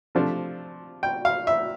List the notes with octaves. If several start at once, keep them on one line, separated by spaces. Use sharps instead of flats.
C3 F3 A3 D4
G5
F5
E5